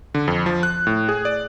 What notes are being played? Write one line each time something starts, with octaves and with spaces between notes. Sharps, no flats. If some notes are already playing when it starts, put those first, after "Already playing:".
D3
F2
F3
F#6
A2
G#4
D5